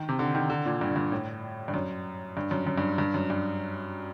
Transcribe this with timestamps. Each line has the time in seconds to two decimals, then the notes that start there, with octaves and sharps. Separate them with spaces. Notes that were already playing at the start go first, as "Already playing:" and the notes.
Already playing: D#3
0.09 C3
0.19 D3
0.35 D#3
0.50 D3
0.66 A#2
0.81 G2
0.96 G2
1.12 A2
1.68 G2
1.74 F#2
2.37 G2
2.51 F#2
2.67 F#2
2.78 G2
2.98 G2
3.14 F#2
3.30 G2